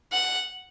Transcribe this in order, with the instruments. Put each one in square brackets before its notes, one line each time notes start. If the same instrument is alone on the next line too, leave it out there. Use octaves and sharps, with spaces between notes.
[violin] F#5